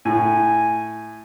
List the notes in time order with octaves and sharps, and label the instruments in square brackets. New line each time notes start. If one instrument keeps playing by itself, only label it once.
[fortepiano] A2 [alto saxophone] G#5